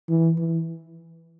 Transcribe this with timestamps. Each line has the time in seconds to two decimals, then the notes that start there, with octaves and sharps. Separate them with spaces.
0.09 E3
0.38 E3